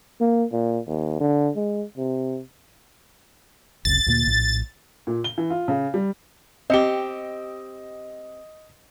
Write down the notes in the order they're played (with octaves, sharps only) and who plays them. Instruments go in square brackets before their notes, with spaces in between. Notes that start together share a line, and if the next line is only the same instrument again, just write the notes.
[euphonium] A#3
A#2
D#2
D3
G#3
C3
[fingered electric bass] F#1 C#2 C3 [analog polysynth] A6
[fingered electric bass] D2 A#2 A#3
A#1 A2
[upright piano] A#2
G7
E3
F4
C#3
G3
[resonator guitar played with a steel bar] C4 G4 [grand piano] D#5 C#7 G7